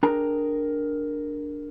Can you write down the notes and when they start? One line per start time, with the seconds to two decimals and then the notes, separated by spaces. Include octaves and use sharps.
0.03 D4 G#4 A#4 G5 A#5